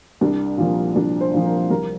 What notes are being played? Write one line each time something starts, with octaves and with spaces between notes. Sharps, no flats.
C2 D4
A#2 F3
C2 D4
C5
A#2 F3
A#4
C2 A#4